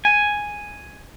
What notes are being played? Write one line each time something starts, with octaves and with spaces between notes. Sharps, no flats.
G#5